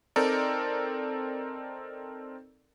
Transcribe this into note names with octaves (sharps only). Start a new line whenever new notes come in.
C4 D#4 A4 A#4 D5